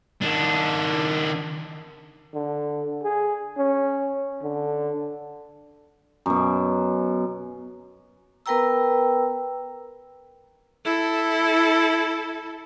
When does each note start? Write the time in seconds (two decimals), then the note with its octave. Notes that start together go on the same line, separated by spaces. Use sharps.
0.22 D#3 D4
2.34 D3
3.03 G#4
3.57 C#4
4.43 D3
6.26 F#2 B2
8.46 B3 A#4 B4 G5 A#5 E6
10.85 E4 A4